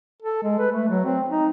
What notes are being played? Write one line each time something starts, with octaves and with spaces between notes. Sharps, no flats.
A4
G#3
B4
A3
F#3
C4
D#4